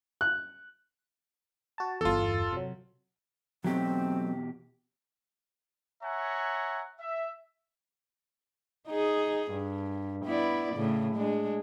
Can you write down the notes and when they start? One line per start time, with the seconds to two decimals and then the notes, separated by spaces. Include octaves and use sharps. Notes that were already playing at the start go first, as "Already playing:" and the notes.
0.21 F#6
1.78 F#4 A5
2.01 G1 E2 F4 A4
2.52 C3 F#3
3.64 E2 B2 F#3 A3 C4 D#4 G4
6.03 C#5 E5 F#5 G#5 A#5
7.00 E5
8.88 D#4 G#4
9.51 G2
10.25 B3 E4 D5
10.74 A2 C#3
11.15 G#3 D4